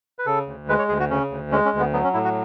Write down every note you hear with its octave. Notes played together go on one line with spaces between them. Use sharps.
B4
C#3 A4
D2
G#3 B4
C#5
D2 G#4
F#4
C#3 C#4
D2
G#3 C#4
C#4
D2
B3
F#3 B3
C#4
A2 E4
F#4